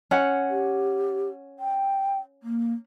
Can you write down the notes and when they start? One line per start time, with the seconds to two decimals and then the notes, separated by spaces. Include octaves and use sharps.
0.11 C#4 F#5
0.50 G4
1.59 G5
2.43 A#3